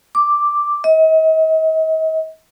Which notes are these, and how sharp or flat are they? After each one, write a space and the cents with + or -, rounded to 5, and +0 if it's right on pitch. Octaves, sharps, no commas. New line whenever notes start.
D6 +0
D#5 +40